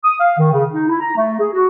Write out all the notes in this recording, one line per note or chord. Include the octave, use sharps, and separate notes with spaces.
D#6
F5
D#3
C#3
D#4
E4
A#5
A3
G#4
F#4